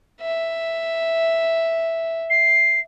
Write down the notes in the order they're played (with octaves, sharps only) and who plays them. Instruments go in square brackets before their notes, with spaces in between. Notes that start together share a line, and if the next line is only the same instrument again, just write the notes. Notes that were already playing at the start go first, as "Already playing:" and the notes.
[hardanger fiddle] E5
[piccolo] C7